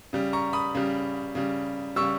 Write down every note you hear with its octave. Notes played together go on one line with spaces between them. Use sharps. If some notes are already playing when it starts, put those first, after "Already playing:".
C#3 G3
A#5 C#6
B5 D#6
C#3 G3
C#3 G3
C#3 G3 C#6 E6